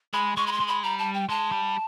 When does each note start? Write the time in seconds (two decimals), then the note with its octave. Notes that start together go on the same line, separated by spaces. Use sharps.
0.13 G#3 B5
0.37 G#3 C#6
0.47 B5
0.52 C6
0.60 G#3
0.68 B5
0.83 G3 A#5
0.99 A5
1.14 G5
1.29 G#3 A5
1.52 G3